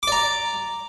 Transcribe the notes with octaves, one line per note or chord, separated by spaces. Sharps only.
D5 A#5 D6